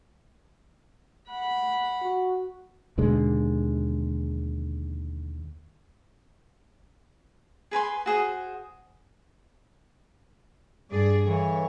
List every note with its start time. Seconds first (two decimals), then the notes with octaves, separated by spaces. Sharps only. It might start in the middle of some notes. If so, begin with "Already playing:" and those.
1.30 F#5 B5
2.01 F#4
2.98 D#2 B2 D3 G#3
7.71 G#4 B4 G#5 C6
8.06 F#4 G#4 C5
10.91 G2 G#4 D5
11.26 G2 D3 E3 C#5